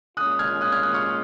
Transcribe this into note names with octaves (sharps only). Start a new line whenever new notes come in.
A#2 G#3 C#4 F4 D#6 F#6
F6 G#6
D#6 F#6
F6 G#6
D#6 F#6
C#6 F6